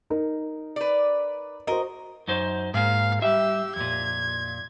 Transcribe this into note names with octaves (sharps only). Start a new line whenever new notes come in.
D#4 A#4
B4 D5
F#4 A#4 C5 D#5
F#2 D#4 C5
G#2 A#3 F5
G3 G4 E5 E6
F2 A#2 G#6